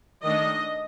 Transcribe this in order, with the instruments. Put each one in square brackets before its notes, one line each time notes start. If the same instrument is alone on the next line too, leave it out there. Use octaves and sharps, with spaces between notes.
[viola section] D#3 A3 D4 D#5